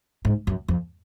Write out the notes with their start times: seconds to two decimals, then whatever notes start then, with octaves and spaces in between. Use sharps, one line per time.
0.25 G#2
0.47 F#2
0.68 F2